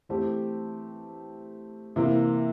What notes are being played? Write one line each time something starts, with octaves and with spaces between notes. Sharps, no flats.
E3 A3 C4 G4
C3 E3 A#3